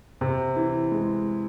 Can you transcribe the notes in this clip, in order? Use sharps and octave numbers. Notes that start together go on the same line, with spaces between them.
C3
E3
G#3